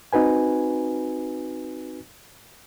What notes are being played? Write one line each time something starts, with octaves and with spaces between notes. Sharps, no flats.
C4 D#4 F#4 B4 G#5